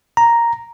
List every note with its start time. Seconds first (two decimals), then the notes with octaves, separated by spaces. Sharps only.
0.17 A#5